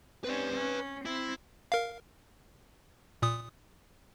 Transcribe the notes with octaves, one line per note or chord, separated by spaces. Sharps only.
C4 C#4 B4 D5
C#4
C4 E4
A#4 F5
A#2 D#6